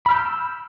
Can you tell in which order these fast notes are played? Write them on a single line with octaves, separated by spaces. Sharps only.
B5 F6 G6 E6